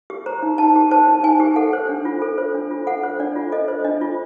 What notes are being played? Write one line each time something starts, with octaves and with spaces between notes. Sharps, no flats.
G4
C5 A#5
D#4
D#4 A5
G4
C5 A5
D#4
D#4 G#5
G4
A4 F#5
C5
D4
F4
A4
C5
D4
F4
A4 F#5
C5
D4 D5
F4
A4 D#5
C5
D4 D#5
F4